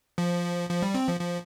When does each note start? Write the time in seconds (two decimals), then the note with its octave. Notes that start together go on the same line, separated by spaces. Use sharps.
0.18 F3
0.69 F3
0.82 G3
0.94 C4
1.08 F3
1.20 F3